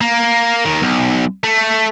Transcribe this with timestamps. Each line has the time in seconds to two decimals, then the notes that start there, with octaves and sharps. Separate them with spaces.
0.01 A#3
0.65 D#2 D#3
0.82 B1
1.44 A3